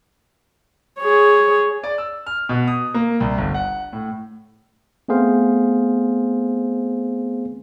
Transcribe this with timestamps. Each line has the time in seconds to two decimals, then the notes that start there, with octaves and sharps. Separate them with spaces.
0.99 G#4 C#5
1.84 D5
1.98 E6
2.26 F6
2.49 B2
2.68 D#6
2.94 A#3
3.20 C2
3.38 G1
3.54 F#5
3.93 A2
5.08 A3 B3 C4 G#4 C5 F5